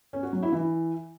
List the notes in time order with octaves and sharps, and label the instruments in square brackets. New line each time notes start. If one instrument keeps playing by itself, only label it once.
[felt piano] C#4
F#4
F#3
E4
E3